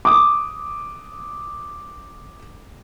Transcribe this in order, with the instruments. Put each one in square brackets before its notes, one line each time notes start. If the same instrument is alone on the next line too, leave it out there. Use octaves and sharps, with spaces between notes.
[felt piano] D6 D#6